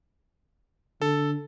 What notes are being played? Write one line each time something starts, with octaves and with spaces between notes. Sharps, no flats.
D3 A4